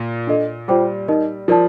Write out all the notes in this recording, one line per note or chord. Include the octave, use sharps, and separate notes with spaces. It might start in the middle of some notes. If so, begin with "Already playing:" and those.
Already playing: A#2
D4 A4 D#5
G3 F4 C5 G5 D6
D#4 A#4 D#5
F3 A#4 D5 A5